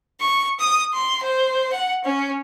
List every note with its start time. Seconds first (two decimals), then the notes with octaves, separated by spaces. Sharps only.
0.21 C#6
0.58 D#6
0.94 C6
1.23 C5
1.72 F#5
2.04 C#4